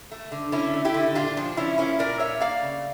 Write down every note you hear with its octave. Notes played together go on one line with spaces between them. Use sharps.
A3
D3
D3 C#4 E4
A3
E4 G4
D3
A#2 D4 F4
F3 D4
F3 C#4 E4
A#3 C#4 E4
A#2 A#4 D5
A#2 C#5 E5
A#3 D5 F5
C#3